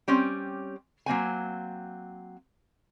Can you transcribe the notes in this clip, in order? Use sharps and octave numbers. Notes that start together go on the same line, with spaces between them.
G3 C4 C#4 G4
F#3 A#3 C4 G#5